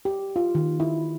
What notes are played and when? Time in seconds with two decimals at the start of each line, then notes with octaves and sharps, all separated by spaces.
0.05 G4
0.36 F4
0.55 D#3
0.80 E4